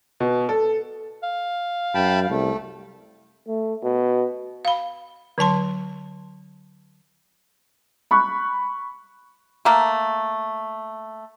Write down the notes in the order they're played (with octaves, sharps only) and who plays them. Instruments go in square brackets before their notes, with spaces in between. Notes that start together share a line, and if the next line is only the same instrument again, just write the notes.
[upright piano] B2
A4
[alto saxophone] F5
[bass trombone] F#2 [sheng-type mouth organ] G5 A5 B5
[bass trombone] C2 [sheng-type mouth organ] A3
[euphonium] A3
B2
[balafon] F5 B5
D3 F#3 A5 C6
[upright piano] B5 C#6 F#6
[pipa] A3 A#3